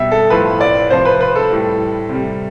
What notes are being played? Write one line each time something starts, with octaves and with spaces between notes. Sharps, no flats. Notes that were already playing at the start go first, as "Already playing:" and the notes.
Already playing: B2 G3 E5
A4
A2 F3 B4
D5
C3 F3 C5
B4
B4
A4
A2 G3
C3 G3